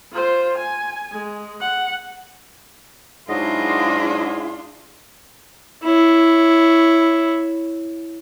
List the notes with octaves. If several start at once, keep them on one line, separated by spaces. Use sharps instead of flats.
F4 C5
G#5
G#3
F#5
G#2 F#3 D4 E4 F4 G#4 D#5
E4 C#5